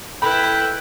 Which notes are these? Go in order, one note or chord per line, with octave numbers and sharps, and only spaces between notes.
E4 A4 B4 G5 B5